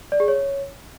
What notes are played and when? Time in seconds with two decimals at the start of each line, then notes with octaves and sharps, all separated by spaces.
0.12 D5
0.20 G#4
0.28 C#5